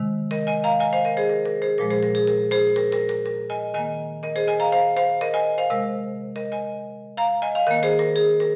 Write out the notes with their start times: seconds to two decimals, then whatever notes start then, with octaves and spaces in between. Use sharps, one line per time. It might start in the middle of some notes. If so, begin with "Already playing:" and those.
Already playing: C3 D#3 G#3
0.31 A#4 D#5
0.47 D#5 G#5
0.64 F5 A#5
0.80 D#5 G#5
0.93 C5 F5
1.05 A#4 D#5
1.17 G#4 C5
1.29 A#4
1.46 A#4
1.62 G#4 C5
1.78 A#2 F3 G#3 A#4
1.90 G#4 C5
2.03 A#4
2.15 G#4
2.27 A#4
2.51 G#4 C5
2.76 A#4
2.93 A#4
3.09 A#4
3.26 A#4
3.50 D#5 G#5
3.74 D#3 A#3 D#5 G#5
4.23 A#4 D#5
4.36 G#4 C5
4.47 D#5 G#5
4.60 F5 A#5
4.72 C5 F5
4.97 C5 F5
5.21 A#4 D#5
5.34 D#5 G#5
5.58 C5 F5
5.70 C3 G#3 A#4
6.36 A#4 D#5
6.52 D#5 G#5
7.17 F5 A#5
7.42 D#5 G#5
7.55 F5
7.67 D#3 A#3 A#4 D#5
7.83 G#4 C5
7.99 A#4
8.16 G#4
8.40 A#4